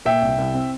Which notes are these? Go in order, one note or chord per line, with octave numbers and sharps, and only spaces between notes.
A#2 E5 G5
C2
C2
C4